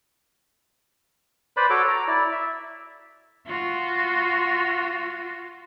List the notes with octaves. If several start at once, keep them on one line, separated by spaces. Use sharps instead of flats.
B4 C5 D5 B5
F#4 A4 C#5 D6
A#5
E4 D5
E5
F4 F#4